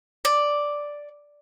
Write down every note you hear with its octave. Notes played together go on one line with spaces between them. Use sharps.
D5